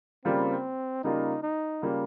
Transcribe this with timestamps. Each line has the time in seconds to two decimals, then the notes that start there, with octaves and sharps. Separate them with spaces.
0.25 C#3 G3 A#3 C4 F4
1.04 C#3 G3 A#3 D#4 F4
1.43 D#4
1.82 C#3 G3 A#3 F4